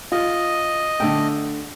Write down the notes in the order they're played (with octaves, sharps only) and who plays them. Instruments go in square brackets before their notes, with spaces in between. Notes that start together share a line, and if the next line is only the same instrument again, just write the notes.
[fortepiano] F4 [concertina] D#5
[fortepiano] D3 A3 G5